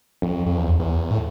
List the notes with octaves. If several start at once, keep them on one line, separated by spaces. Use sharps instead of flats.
F2
F2
E2
E2
A2